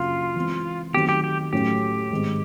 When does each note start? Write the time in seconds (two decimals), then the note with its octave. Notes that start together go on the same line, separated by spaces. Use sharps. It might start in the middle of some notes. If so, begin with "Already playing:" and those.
Already playing: F#2 C#3 F#3 A#3 D4 F4
0.36 E3 G#3 C4
0.94 D#3 F#3 A3 C4 G4
1.09 G4
1.24 G4
1.53 A2 F#3 A3 C#4 G4
2.11 G#2 D#3 G#3 C4